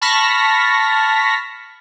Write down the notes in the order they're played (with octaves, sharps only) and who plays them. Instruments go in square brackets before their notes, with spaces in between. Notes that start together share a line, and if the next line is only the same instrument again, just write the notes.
[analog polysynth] A5 B5 C#6 F6 A#6 B6